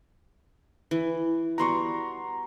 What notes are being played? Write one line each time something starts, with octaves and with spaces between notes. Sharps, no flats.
E3
G3 B3 F#4 A#5 C6 C#6